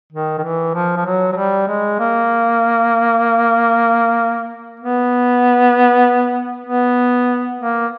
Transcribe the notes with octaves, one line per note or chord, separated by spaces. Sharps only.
D#3
D#3
E3
F3
F3
F#3
F#3
G3
G#3
A#3
B3
B3
A#3